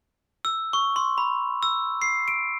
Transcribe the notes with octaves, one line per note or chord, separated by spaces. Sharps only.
E6
C#6
C6
B5
E6
C7
D7